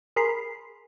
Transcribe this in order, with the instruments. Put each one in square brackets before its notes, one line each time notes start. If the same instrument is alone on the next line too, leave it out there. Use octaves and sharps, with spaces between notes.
[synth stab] G#4 A#4 B5 C6